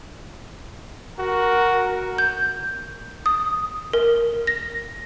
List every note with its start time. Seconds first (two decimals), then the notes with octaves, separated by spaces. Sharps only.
1.19 F#4 A#4
2.18 G6
3.26 D#6
3.93 A#4
4.47 A#6